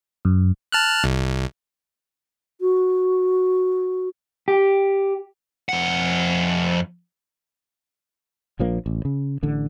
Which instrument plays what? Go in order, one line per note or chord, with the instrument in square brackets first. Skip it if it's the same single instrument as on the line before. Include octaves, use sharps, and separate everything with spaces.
[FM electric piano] F#2
[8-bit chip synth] A5 F6 F#6
C2
[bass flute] F#4
[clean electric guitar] G4
[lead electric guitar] F2 F#5
[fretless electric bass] A#1 F3 A#3 D4
A1
C#3
A1 D3